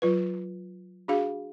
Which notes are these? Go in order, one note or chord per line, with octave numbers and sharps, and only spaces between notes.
F#3 F4 B4
D4 F#4 G#4 F5